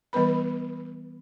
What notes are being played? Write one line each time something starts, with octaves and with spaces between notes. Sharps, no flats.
E3 G3 B3 B4 B5